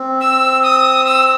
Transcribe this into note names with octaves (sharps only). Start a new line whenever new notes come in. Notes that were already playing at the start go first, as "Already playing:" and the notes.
Already playing: C4
E6
D#6
E6